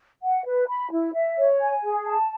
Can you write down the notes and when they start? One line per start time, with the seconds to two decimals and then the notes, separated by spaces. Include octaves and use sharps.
0.23 F#5
0.46 B4
0.69 B5
0.91 E4
1.14 E5
1.38 C#5
1.61 G#5
1.83 G#4
2.07 A5